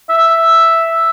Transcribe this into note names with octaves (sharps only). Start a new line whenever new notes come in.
E5